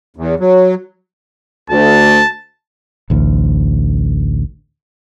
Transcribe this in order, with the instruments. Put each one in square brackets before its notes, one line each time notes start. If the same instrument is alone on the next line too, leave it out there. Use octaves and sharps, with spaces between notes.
[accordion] E2
F#3
[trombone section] D2 [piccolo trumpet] A5
[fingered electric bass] A1 D2